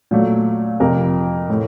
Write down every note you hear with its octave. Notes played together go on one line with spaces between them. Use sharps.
A#2 F#3 A3
F2 C3 F3 A#4
A2 A3